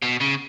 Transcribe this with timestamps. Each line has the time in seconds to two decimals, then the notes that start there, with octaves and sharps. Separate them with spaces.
0.02 B2
0.20 C#3